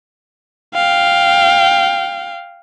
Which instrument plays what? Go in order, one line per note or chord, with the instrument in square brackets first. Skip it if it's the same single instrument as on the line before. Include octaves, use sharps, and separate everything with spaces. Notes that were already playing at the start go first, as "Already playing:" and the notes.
[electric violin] F5 G5